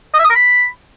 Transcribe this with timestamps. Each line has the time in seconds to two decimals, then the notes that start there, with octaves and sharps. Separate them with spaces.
0.14 D#5
0.19 E5
0.25 D#6
0.30 A#4
0.35 B5